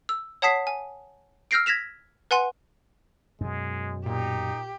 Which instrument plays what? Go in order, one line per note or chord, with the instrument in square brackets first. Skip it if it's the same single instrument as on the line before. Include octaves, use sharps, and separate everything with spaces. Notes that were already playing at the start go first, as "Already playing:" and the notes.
[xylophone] E6
C#5 F#5 A5 D#6 B6 C7
G#5
E6 F6 G6 A#6 C7 D7
G#6 A#6 B6 E7 F7
B4 F#5 G#5 C6
[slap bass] F#2 B2 [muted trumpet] G#3
[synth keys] A#2 [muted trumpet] D#4 [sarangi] G4